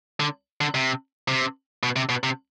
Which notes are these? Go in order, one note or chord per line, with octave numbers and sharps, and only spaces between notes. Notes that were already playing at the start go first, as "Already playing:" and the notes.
D3
D3
C3
C3
B2
C3
B2
C3